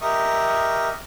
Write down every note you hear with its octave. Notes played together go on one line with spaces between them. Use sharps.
G4 A#4 D#5 E5 C#6 D#6